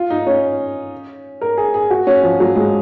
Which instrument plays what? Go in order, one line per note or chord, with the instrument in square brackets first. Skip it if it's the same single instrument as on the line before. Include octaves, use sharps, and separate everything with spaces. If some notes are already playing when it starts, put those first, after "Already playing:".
Already playing: [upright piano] F4
D#4
C#4
A#4
G#4
G#4
F#4
C#4
F3
F#3
G#3